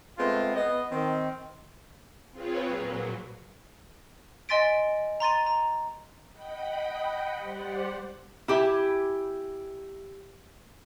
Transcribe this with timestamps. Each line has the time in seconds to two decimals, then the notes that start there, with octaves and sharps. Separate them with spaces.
0.18 G#3 A3 B3 C4 F4
0.55 B3 D#5
0.90 D#3 C4
2.32 C4 F4 G#4 B4 C#5
2.65 A#2 F#3
4.49 D#5 G#5 C6 A6 B6 D7
5.20 A#5 C6 A6 D#7
5.47 A#5
6.32 D#5 F#5 G5 B5
7.37 G3 G4 C5 D5 F#5
8.48 E4 G4 G#5